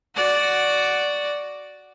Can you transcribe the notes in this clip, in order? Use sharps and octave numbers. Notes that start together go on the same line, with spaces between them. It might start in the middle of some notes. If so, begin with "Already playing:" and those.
F#4 D5